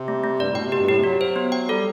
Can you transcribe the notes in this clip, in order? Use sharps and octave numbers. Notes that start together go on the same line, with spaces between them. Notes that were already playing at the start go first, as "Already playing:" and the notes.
Already playing: C3
A3
A3
G2 D5
A2
B2 G5
C3
B2 G4
G2
A2 G4
C3
F#3 F#4
C5
B3
G5
G3 A4